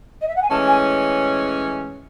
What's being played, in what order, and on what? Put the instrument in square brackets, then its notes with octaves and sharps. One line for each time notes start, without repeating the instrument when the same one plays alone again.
[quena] D#5
E5
F#5
G#5
[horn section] A2 E3 G#3 C#4 [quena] A5
[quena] G#5